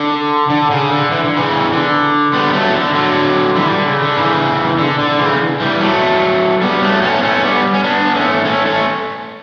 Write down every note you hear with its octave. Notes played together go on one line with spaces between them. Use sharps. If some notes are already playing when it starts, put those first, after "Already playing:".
Already playing: D3
D3
C#3
D3
E3
D3
C#3 E3
D3
G3 B3
F#3 A3
E3
D3
D3 F#3
E3 G3
D3
C#3
D3
C#3 E3
D3
D3
C#3 E3
E3 G3
F#3 A3
G3 B3
F#3 A3
A3 C#4
B3
A3 C#4
G3 B3
C#4
B3 D4
B3
A3 C#4
A3 C#4
A3 C#4